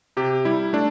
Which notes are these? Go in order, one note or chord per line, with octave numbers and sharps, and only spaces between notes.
C3 G4
G3 E4
A3 D4